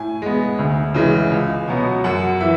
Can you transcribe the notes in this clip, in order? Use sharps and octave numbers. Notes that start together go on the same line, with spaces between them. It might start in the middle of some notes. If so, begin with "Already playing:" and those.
Already playing: A2 G#5
G#3 B3
D2
C#3 E3 G#3
C#2
B2 F#3 B3
F#2 F#5
E3 E5